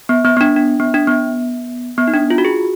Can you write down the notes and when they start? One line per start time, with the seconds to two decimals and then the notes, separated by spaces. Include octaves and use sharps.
0.09 B3
0.25 B3
0.37 B3
0.41 D4
0.56 D4
0.80 B3
0.94 D4
1.07 B3
1.98 B3
2.08 D#4
2.14 D4
2.30 F4
2.38 F#4
2.45 G#4